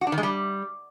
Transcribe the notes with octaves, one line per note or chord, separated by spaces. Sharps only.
F#4
D4
D#3
G#3
G3